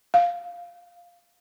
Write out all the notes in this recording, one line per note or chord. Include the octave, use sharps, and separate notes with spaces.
F5